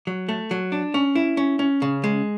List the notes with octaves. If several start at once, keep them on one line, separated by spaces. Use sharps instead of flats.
F#3
A3
F#3
D4
C#4
E4
C#4
C#4
C#3
G#3